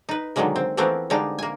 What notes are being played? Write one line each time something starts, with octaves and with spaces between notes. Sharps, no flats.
D#4 B4
B2 D3 D#3 F#3 G#3 A#3
C4
E3 F3 A3 B3 C4 A#4
D3 G3 G#3 D4 D#4 F5
A#3 G#5